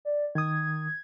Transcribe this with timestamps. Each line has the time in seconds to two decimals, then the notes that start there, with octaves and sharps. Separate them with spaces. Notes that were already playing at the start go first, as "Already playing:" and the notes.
0.05 D5
0.35 D#3 D#6 G#6